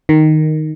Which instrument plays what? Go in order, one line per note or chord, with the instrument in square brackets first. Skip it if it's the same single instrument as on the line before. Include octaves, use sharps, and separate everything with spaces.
[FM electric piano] D#3